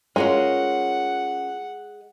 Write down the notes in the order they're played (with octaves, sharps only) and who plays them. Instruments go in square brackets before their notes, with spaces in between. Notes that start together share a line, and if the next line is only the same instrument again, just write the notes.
[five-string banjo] G#3 [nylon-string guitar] C#4 F4 A#4 [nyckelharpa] F#5